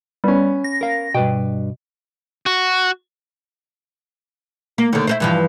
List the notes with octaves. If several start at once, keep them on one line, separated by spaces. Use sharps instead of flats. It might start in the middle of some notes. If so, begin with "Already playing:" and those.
G3 B3 C#4
A#6
A#4 F5
G2 B2 B4 G5
F#4
A#3
D#2 D3
E4 A#4 C5
G2 E3 F3